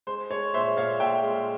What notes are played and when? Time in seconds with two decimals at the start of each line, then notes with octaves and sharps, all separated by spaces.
0.07 G#3 C5
0.30 G#3 C#5
0.54 A#2 C5 E5
0.77 A#2 C#5 F5
1.00 A#2 E5 G5
1.23 G#3